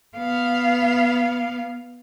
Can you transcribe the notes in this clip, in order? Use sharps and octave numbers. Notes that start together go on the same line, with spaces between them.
B3 F5